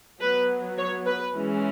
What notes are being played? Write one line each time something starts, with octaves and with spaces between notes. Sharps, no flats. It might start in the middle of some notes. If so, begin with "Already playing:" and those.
F#3 B3 B4
C#5
B4
E3 G#3 C#4